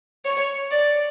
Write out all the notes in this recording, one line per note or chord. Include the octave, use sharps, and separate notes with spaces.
C#5
D5